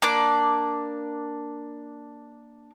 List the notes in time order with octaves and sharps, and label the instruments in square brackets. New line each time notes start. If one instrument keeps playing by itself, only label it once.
[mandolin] A#3 D4 D6